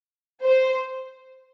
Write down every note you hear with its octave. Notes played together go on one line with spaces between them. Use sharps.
C5